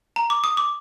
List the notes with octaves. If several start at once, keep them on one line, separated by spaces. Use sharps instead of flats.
A#5
D6
D#6
D6